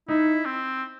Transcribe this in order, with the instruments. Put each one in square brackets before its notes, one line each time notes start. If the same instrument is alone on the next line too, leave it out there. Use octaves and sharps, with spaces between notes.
[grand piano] D#4 [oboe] E4
[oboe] C4